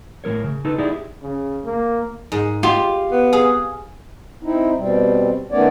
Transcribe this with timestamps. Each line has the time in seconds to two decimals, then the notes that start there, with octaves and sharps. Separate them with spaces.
0.24 A2 G#3 A#4 C#5
0.44 C#3
0.65 D#4 A4 B4
0.78 D#4 E4 G4 G#4 D5
1.23 C#3
1.65 A#3
2.32 G#2
2.63 F4 G4
3.12 B3
3.33 G#4 F5
4.43 C4 D#4 E4
4.77 B2 G3 C4
5.51 D#3 A3 B3 C#4 C#5 D5